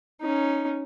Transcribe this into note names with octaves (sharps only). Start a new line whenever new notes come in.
C#4 D#4